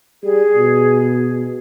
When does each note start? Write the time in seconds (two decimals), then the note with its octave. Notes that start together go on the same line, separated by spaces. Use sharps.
0.23 G3 G#4
0.55 B2